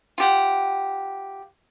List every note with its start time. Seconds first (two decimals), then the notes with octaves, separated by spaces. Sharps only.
0.18 F4 G4 F#5